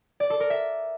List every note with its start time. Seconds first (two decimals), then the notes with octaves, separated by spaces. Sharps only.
0.20 D5
0.30 A4
0.40 A#4
0.50 E5